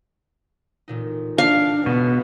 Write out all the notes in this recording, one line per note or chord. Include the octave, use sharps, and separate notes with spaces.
A1 A#2 D#4
D4 F5
C#2 B2 B3